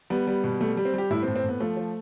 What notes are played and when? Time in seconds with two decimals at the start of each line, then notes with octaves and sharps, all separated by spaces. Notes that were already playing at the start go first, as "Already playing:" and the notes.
0.10 G3 B3
0.27 G3
0.44 B2
0.61 G3 A3
0.77 G3
0.85 C4
0.94 G3 G4
1.10 A2 E4
1.23 C4
1.27 A2
1.36 C4
1.44 A2 B3
1.60 F3 A3
1.77 F3